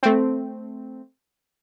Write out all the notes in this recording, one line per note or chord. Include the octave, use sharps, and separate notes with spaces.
A3 C4